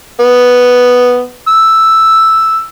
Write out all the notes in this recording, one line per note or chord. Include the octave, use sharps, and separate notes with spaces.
B3
E6